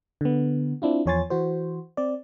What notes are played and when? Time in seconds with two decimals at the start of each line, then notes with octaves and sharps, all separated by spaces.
0.21 D3 B3
0.82 C4 D4 E4 F4
1.06 E2 F3 C#5 G#5 C6 A6
1.30 E3 F#4 C5
1.97 C4 D5